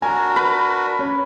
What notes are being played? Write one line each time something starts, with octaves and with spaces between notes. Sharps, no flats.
D4 F#4 A#4 G#5 A#5
B4
C#4